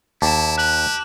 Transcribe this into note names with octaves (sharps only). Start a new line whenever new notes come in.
D#2 E4 A5 D6 E7
G4 F#6 F#7